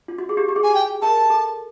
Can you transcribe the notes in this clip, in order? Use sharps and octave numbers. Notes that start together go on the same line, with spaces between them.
F4
F#4
G#4
G4
G4
G#4
G#5
G5
A#4 A5
A4